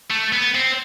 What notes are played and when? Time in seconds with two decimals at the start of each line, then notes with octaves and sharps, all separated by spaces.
0.10 A3
0.33 B3
0.55 C4